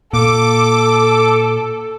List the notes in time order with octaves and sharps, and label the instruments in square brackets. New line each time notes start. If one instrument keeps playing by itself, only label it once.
[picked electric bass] A#2 [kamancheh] A4 [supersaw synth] D6